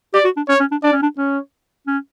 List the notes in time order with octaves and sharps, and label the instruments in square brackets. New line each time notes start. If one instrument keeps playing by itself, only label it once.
[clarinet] G4 [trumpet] D5
[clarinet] F#4
D4
[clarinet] C#4 [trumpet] C#5
[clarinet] C#4
D4
[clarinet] D4 [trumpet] D5
[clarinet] C#4
D4
[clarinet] C#4 [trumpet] C#5
[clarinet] C#4